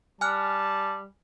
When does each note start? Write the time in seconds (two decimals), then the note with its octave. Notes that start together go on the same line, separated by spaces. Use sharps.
0.21 G3 G#5 A5 F6 F#6